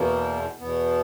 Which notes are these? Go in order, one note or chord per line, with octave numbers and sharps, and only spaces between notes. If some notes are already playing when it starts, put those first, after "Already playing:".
Already playing: E2 B2 A#3
E2 B2 B3